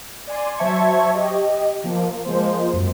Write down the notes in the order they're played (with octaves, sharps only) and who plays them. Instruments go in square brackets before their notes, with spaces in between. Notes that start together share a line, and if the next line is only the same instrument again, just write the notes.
[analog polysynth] D5 G#5 C6
F#3 C5 E5 A5 C#6 G#6
G4 D#5
F3 A#3
F3 G#3 A#3 C5
F#2